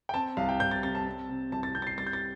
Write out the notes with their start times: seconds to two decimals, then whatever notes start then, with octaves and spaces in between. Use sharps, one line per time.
0.09 G5
0.14 C4 A5
0.37 C2 F5
0.49 G5
0.60 C2 G6
0.71 A6
0.83 C3 A6
0.95 A5
1.06 C4
1.29 C3
1.52 C2 A5
1.63 A6
1.75 C4 G6
1.82 A6
1.87 C7
1.98 G3 A6
2.07 G6
2.13 A6